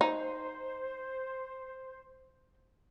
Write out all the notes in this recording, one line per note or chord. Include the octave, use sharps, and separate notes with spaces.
D#4 C5